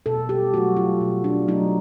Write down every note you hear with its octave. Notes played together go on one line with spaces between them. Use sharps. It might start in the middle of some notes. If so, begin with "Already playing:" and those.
B2 A4
G4
F#3 A3 F#4
F4
B2
D4
F#3 A3 D#4